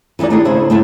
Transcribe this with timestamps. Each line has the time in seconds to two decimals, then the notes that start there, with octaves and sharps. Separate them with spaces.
0.19 E3 G3 G#3 D#4 D5
0.30 A3 D4 D#4 G4 G#4
0.45 C#3 E4 G#4 C5
0.70 A2 A3 C4 E4 E5 A5